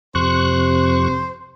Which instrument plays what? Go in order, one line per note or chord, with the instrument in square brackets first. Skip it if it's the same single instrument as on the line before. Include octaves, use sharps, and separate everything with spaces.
[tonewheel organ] F2 C#6 F#6 [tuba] C3 [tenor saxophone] C5